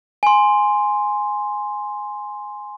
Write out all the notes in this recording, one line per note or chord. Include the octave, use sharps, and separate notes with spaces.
G#5 C6